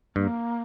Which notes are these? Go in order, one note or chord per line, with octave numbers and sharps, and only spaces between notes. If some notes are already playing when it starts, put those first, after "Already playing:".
G2 A#3